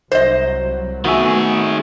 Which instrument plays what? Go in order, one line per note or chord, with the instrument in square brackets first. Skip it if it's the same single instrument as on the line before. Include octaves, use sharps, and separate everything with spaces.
[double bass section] C2 F#3 [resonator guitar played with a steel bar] C5 D#5
[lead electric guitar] D#3 G#4 [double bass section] A3 B3 [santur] F#4 E5